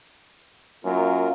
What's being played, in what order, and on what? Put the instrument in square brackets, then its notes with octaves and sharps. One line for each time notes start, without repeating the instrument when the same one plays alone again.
[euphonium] F#2 [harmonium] A#3 F4 A#4